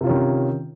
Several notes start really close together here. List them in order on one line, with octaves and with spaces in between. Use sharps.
C3 F4 C#4 D#3